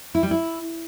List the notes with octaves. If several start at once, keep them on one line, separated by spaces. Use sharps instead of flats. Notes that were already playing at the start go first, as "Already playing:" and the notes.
E4
G3
E4